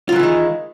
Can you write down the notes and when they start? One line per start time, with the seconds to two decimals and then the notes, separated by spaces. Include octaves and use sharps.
0.09 F4
0.12 F#3
0.16 E3
0.19 D#3
0.23 G#3